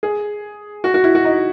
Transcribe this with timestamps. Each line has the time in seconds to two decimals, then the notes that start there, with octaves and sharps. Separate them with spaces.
0.03 G#4
0.84 F#4
0.94 F#4
1.04 E4
1.15 F#4
1.25 D#4